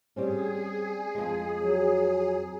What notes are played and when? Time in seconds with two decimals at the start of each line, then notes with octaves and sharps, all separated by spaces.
0.16 G3 C4 C#4 G#4
1.15 F2 G#3
1.61 F#3